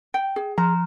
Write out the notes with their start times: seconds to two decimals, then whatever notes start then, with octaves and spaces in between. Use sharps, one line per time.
0.14 G5
0.36 G#4
0.58 F3 A#5